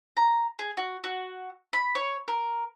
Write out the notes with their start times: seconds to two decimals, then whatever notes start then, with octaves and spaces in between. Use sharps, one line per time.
0.17 A#5
0.59 G#4
0.77 F#4
1.04 F#4
1.73 B5
1.95 C#5
2.28 A#4